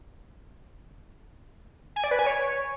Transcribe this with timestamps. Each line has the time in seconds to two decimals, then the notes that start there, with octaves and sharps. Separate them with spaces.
1.96 G#5
2.04 D5
2.11 B4
2.19 G#5
2.26 C#5